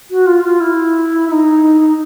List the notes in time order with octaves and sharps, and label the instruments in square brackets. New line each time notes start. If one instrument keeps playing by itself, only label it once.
[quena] F#4
F4
F4
E4
E4
D#4